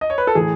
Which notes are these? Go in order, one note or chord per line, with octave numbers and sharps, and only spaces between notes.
D#5
C#5
B4
A4
A2 E3 G#4